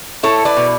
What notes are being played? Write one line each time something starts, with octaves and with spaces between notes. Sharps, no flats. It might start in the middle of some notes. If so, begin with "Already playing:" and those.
E4 A4 C#5
B4 D5
B2